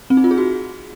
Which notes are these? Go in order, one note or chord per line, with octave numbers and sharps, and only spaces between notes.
C4
D#4
F4
G#4
F#4